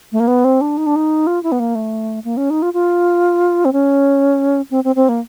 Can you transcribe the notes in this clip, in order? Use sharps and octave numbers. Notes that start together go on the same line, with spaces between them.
A3
A#3
B3
C4
D4
D#4
D4
D#4
F4
E4
B3
A#3
A3
A#3
C#4
D#4
F4
F4
C4
C#4
C4
C4
C4
A#3